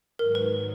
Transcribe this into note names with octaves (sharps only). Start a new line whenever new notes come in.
G#2 D#3 F#3 A#4
B4